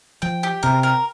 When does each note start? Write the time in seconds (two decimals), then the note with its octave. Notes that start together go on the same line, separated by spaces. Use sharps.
0.22 F3 G5
0.43 G4
0.63 C3 A#4
0.83 A#4